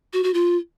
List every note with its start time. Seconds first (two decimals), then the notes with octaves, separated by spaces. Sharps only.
0.13 F#4
0.24 F#4
0.34 F4